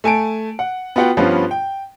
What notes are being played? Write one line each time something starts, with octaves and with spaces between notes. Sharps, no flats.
A3 G#5 A5 D7
F#5
B3 F4 F#4 F#5 G5
G2 F3 G3 B3 C#4 F4
G5